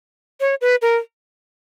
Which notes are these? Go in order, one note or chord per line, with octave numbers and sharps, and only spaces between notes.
C#5
B4
A#4